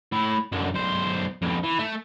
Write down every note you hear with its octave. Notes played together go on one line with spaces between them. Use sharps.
A2 E4
F#2 D3
B1 C5
F2 B2
E3
A3